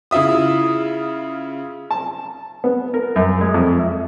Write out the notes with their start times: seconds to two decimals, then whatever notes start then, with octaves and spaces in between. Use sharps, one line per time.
0.11 C#3 E4 F4 E5 D#6
1.91 A5
2.64 B3
2.94 A#4
3.16 F#2
3.41 G#3
3.54 F2
3.79 E5